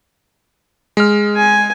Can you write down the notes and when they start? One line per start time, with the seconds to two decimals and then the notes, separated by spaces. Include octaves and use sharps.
0.97 G#3 F6
1.36 G#5